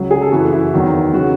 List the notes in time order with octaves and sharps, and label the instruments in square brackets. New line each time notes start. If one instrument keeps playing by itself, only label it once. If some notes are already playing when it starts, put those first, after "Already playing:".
Already playing: [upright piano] C#2 C#3 F#3
G#4
A4
F#2 C#3 E3 F#4
E4
E2 D#3 F#3
C#3 F#3 F#4